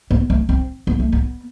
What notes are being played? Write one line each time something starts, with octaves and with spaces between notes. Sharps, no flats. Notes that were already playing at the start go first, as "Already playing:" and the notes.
B3
A3
C4
B3
A3
B3